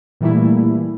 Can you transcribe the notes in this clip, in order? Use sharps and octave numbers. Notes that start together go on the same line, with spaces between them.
A#2 E3 G3 A3 A#3 E4